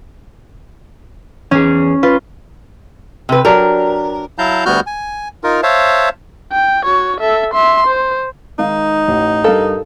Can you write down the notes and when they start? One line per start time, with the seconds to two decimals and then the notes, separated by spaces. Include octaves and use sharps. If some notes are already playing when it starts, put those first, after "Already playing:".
1.51 E2 C#4 G#4
2.03 F4 B4
3.29 C3 B4
3.45 F#3 D4 G4 A#4
4.38 F#3 E4 F5 A5 A#5 G6
4.66 D2 G3 B3 F#4 F6 G6
4.87 G#5
5.44 D#4 F4 A#4
5.63 C5 C#5 E5 F5 A5
6.52 G5
6.84 F#4 C#5
7.20 A4 E5
7.54 E5 C6
7.87 C5
8.58 D#3 G#3 D#4 F5
9.08 A1
9.44 G2 A4 A#4 F5